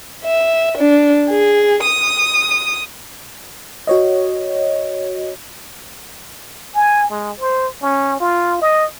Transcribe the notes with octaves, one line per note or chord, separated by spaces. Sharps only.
E5
D4
G#4
D#6
F#4 C#5 D#5
G#5
G#3
C5
C#4
F4
D#5